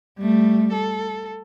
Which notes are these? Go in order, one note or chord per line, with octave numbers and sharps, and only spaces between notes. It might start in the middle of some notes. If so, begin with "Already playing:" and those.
G3 A3
A4